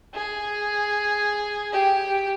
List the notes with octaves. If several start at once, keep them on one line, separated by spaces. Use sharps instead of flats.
G#4
G4